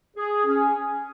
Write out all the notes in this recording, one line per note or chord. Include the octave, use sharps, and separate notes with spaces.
G#4
C#4